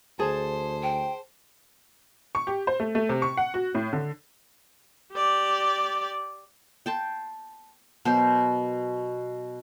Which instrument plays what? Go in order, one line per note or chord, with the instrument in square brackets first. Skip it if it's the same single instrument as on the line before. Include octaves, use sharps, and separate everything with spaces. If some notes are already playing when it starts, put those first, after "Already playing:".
[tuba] D2 [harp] G#4 A5 [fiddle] C5
[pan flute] G5
[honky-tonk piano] C#6
G4
C5
A3
A3
C3
C#6
F#5
F#4
A2
D3
[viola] G4 D5
[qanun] G5 A5 C6
B2 F#3 A#4 C5